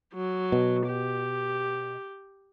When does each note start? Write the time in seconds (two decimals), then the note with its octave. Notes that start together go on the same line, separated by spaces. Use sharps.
0.14 F#3
0.52 B2
0.87 G4